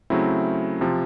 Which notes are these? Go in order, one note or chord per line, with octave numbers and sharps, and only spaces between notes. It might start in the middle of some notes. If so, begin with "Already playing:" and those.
C#3 F#3 A3 C4 E4
C3 F3